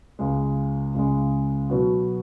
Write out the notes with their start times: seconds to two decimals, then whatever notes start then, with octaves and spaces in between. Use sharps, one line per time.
0.19 C#2 C#3 G#3
0.95 C#2 C#3 G#3
1.70 B2 F#3 B3 F#4